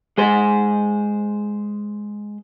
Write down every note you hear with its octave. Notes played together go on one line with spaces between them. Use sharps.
G#3 G#4 C5